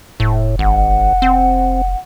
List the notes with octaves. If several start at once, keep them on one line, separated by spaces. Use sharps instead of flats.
F1 A2
G#1 F#5
C4